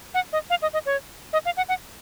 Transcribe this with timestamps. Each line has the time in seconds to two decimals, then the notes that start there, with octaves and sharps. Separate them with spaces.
0.14 F#5
0.33 D#5
0.50 F5
0.62 D#5
0.73 D#5
0.86 C#5
1.33 D#5
1.45 F5
1.57 F#5
1.69 F#5